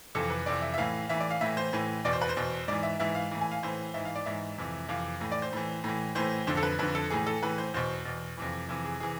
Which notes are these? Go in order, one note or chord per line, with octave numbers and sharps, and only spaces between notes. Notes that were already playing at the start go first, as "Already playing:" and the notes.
F2 C3 E3 A4
B4
F2 C3 E3 D5
E5
E5
A2 E3 F5
A2 E3 E5
D5
F5
A2 E3 E5
C5
A2 E3
E2 B2 D5
C5
B4
C5
E2 B2
G#2 E3 D5
E5
G#2 E3 E5
F5
A2 E3
G#5
F5
A2 E3 C5
G#2 E3 E5
F5
D5
G#2 E3 E5
F2 C3 E3
F2 C3 E3 F5
A2 E3
D5
C5
A2 E3
A2 E3
A2 E3 C5
F2 D3 C5
A4
B4
F2 D3 B4
A4
A2 E3 G#4
A4
A2 E3 B4
C5
E2 B2 C5
E2 B2
F2 C3 E3
F2 C3 E3
G#4
C3 E3 G#4